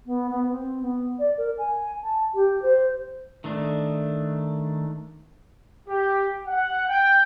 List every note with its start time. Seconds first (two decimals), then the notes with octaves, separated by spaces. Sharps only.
0.06 B3
0.30 B3
0.50 C4
0.82 B3
1.19 D5
1.38 A#4
1.58 G#5
2.03 A5
2.35 G4
2.62 C5
3.44 D#3 A3 D4
5.88 G4
6.47 F#5
6.89 G5